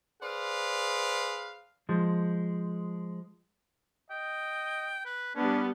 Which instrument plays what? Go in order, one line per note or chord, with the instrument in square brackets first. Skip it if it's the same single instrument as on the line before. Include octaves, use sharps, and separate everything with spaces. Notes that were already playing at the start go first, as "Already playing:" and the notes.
[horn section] G#4 B4 C5 D5 F5 B5
[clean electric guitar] F3 G#3
[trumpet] D#5 [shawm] G5
[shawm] B4
[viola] G3 B3 [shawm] C#4 [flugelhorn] D4 [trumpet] B4